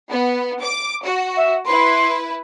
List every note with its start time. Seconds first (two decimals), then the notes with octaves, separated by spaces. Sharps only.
0.10 B3
0.61 D6
1.04 F#4
1.36 E5
1.65 E4 B4 C6